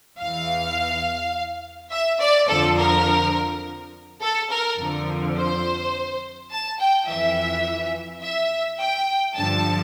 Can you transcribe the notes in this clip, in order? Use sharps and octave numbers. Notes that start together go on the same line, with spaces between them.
E2 F5
E3
E5
D5
F2 D3 F3 A4
A#4
A4
A#4
F2 D3 F3
C5
A5
G5
F2 E3 E5
E5
G5
G2 D3 F3 A5